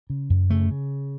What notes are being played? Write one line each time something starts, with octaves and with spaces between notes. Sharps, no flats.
C#3
F#2
C#3 A3
C#3